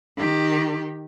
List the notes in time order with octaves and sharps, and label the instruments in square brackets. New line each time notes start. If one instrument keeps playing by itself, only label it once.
[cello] D#3 G4